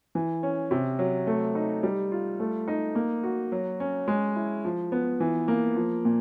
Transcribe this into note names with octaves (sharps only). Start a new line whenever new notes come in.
E3
C#4
C3
F#3
A3
D#4
G3
F4
A3
D#4
A#3
F#4
F#3
C#4
G#3
E4
F3
B3
E3
A#3
F3
A#2